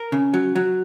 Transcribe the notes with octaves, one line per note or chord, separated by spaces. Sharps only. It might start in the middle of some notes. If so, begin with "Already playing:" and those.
Already playing: A#4
C#3
F#3
F#3